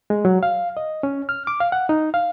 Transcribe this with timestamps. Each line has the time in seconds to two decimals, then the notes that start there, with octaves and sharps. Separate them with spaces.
0.10 G#3
0.25 F#3
0.43 F5
0.77 D#5
1.03 C#4
1.29 F6
1.47 D6
1.60 F5
1.72 F#5
1.89 D#4
2.14 F5